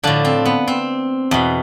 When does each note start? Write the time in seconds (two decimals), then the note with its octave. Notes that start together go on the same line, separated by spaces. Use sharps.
0.03 A2 D3 F3 D4
0.25 C4
0.45 B3
0.68 C4
1.31 E2 B2